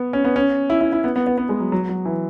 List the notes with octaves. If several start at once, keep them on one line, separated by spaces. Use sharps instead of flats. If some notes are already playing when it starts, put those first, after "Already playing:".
Already playing: B3
C#4
B3
C#4
E4
E4
E4
B3
B3
B3
B3
G#3
F#3
F#3
F#3
E3